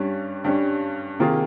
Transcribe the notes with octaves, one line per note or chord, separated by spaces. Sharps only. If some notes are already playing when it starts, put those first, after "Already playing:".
Already playing: G2 G3 C#4
G2 G3 C#4
C3 D#3 A#3 F4 G#4